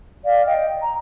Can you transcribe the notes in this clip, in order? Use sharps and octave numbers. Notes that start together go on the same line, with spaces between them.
D5 F5
D#5 G5
A#5